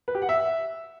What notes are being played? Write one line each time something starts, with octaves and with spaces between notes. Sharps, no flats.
B4
G4
F#5
E5